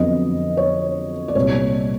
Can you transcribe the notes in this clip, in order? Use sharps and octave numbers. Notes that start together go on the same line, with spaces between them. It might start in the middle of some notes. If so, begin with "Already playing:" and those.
Already playing: F2 D3 F#3 B3 D#5
C#5
D5
C2 A#2 G3 C#5